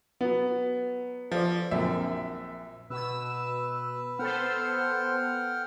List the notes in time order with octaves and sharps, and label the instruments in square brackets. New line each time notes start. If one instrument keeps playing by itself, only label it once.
[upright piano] F#3 B3
[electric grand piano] F3 [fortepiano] F4 A4 D5
[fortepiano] A#1 F#2 C4 [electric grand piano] E5
[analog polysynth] B2 E6 [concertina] B4
[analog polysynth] B3 A4 C5 [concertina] F#5 G5 F6